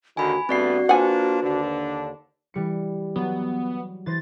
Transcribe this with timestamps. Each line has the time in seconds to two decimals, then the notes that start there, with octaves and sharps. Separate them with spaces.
0.17 D#2 D3 D#3 F#4 G#5 B5
0.49 G2 A3 B3 C4 F#4 D5 C7
0.89 A#3 D4 F4 B4 C5 F#5 G#5
1.43 D#2 D3 D4
2.54 E3 G3 C#7
3.16 F#3 B3
4.06 E3 C5 A6 A#6